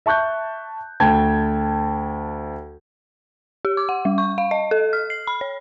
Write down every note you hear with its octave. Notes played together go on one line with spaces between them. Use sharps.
E5 A5 C#6 F#6 G6
D2 G5 A5 G#6
G4
D6
F#5
G3
C#6
F5
D#5
A4
F6
C7
B5
C#5